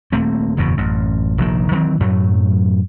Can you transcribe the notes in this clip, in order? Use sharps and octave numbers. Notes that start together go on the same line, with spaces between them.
D#1 A3 A#3 C4
F#1 E2 G#2 B2
A1 F#2
F1 A#1 D#3
D#3 E3 F#3 C4
F#2 A2 F#3 A3